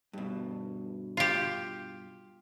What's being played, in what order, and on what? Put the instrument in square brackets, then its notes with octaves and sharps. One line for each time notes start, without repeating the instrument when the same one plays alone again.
[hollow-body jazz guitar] G2 B2
[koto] F4 G4